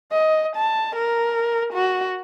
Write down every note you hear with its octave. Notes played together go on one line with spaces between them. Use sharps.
D#5
A5
A#4
F#4